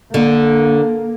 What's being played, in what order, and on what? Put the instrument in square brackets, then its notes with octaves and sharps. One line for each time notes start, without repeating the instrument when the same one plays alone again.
[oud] D3 [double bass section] A#3